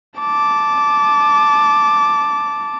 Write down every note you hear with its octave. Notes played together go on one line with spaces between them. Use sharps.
A5 D6